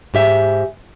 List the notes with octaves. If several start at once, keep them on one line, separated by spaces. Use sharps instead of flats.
G#2 G4 E5